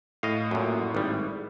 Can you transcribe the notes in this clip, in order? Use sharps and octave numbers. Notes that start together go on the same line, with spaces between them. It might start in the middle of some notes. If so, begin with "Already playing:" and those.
A2 D#5 F5
F#2 A#2
G#1 G3